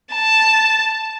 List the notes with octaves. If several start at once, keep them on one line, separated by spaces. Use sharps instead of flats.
A5